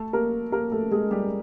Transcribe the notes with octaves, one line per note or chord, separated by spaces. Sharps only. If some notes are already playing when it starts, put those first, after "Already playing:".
Already playing: A3 A4
A#3 A#4
A#3 A#4
A3 A4
G#3 G#4
G3 G4